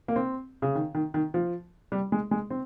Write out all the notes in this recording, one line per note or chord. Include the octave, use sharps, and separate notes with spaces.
A#3
C4
C#3
D#3
D#3
D#3
F3
G3
G#3
G#3
C4